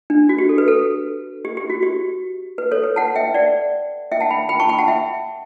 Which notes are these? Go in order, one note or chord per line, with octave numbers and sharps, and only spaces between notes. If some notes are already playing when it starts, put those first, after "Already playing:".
D4
F#4
G4
A4
B4
A4
G4
G4
F#4
G4
B4
A4 C#5
B4
F#5 A5
E5 G5
D5 F#5
E5 G5
F#5 A5
G5 B5
G5 B5
A5 C#6
G5 B5
F#5 A5
E5 G5